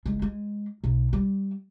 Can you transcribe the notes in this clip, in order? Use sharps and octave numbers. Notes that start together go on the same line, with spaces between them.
F#1 G#3
G#3
B1
G3